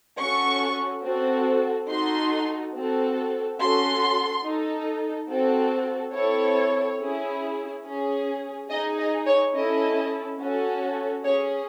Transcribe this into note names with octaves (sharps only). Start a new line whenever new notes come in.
C#4 F#4 A4 C#6
C4 F#4 A4
D#4 F#4 A4 C6
C4 F#4 A4
C#4 F#4 A4 C6
D#4 A4
C4 F#4 A4
C4 E4 A4 C#5
C#4 E4 G#4
C#4 G#4
D#4 G#4 D#5
D#5
C#5
C#4 E4 A4 D#5
C#4 F#4 A4
C#4 G#4 C#5